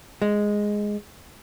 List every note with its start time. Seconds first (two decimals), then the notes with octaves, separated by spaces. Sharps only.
0.22 G#3